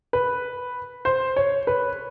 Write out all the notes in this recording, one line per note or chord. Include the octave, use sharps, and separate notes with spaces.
B4
C5
C#5
B4